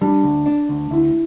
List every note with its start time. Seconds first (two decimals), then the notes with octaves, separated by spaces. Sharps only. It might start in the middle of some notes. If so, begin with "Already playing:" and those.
0.01 G3 D4
0.24 D2
0.46 D4
0.69 D2
0.91 D2 E4